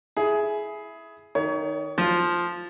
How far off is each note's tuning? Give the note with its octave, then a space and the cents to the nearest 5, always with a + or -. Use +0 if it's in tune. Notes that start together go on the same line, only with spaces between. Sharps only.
E4 +0 G#4 +15
D#3 +0 C#5 +30
F3 +0 F4 +0